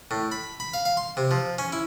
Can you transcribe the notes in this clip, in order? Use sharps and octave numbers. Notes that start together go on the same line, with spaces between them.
A2
B5
B5
F5
F5
C6
C3
F3
C#4
E4